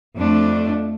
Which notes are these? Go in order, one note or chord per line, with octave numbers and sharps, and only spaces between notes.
F2 A3 D4